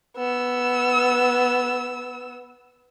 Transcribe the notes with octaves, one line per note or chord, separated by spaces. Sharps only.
B3 E6